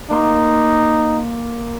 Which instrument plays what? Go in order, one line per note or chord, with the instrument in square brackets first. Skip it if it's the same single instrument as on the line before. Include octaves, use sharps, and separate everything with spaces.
[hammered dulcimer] A#3 C6 [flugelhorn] D#4